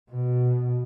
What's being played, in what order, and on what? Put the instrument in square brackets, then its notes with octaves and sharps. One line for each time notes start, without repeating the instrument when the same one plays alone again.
[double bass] B2